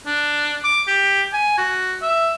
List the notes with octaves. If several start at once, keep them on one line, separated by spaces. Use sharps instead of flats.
D4
D6
G4
G#5
F#4
E5